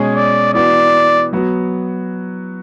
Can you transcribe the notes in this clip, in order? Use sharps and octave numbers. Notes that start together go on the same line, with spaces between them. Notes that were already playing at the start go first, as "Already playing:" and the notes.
Already playing: B2 G#3 C#4 G#4
D5
E3 B3 F#4 D5
F#3 B3 F#4